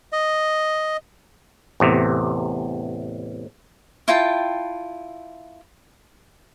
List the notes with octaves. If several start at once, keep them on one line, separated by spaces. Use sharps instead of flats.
D#5
A1 E2 C3
E4 F4 G5 A5